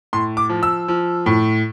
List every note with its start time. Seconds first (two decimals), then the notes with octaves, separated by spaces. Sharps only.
0.13 A2 C6
0.37 D6
0.49 F3
0.63 E6
0.88 F3
1.26 A2